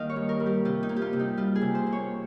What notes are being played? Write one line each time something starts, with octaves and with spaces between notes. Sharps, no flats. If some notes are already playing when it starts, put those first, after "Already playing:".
Already playing: D#3 G3 A#3 D#5 F5
C#5
G2
A#4
G3
G4
C3 F4
D#4
A#3
G4
F4
C3
D#4
G3 F4
G#4
C3
C5
A#3
C#5